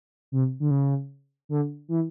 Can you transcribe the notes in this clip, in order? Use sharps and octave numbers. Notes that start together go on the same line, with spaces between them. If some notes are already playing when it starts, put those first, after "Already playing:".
C3
D3
C#3
D3
E3